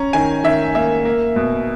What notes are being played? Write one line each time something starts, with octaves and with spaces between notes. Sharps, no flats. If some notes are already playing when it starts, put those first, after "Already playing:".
Already playing: C#4 A#5
D#3 G#5
D#3 E5
A#3 E5
A#3
B2